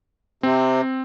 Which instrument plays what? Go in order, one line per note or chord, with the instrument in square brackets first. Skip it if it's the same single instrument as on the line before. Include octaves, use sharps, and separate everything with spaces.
[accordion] C3 [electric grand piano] C4